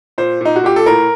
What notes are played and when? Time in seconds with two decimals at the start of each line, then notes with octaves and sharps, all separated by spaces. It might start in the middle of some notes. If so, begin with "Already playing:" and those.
0.18 A#2 C5
0.41 A#2 D#4
0.56 F#4
0.64 A#2 G4
0.76 A4
0.86 A2 A#4